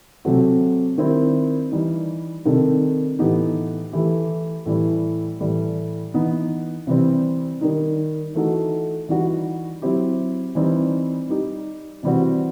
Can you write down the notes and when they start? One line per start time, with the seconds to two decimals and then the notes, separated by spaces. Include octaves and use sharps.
0.25 C3 F#3 A3 C4 F#4
0.98 D#3 G3 C4 E4
1.71 E3 G3 D#4
2.45 C3 D#3 G3 D#4 A4
3.19 A2 E3 B3 D#4 G4
3.93 E3 A3 E4 G4
4.66 A2 E3 G3
5.40 A2 E3 G3
6.14 E3 B3 D#4
6.87 C3 E3 G3 C4
7.61 D#3 G3 D#4
8.35 E3 A3 D#4 F#4 A4
9.08 E3 G3 D#4 F#4
9.82 F#3 C4 E4 G4
10.55 E3 G3 C4 D#4 G4
11.29 G3 D#4 G4
12.03 C3 E3 G3 C4 F#4